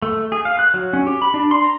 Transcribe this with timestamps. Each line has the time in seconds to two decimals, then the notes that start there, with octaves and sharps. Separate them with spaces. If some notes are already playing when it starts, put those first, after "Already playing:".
0.02 A3
0.32 G#4
0.45 F5
0.59 F#6
0.74 F#3
0.93 C#4
1.07 G4
1.22 B5
1.34 D4
1.51 C6
1.64 A#5